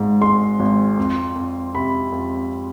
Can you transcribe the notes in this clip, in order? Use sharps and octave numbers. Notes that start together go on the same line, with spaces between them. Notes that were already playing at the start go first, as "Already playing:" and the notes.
Already playing: G#1 G#2
G#3 C6
G#1
F2
F2
C3 B5
F2